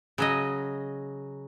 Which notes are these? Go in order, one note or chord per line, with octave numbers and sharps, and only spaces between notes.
C#3 F#3 D#5